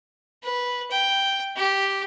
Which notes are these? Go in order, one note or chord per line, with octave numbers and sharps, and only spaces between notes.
B4
G5
G4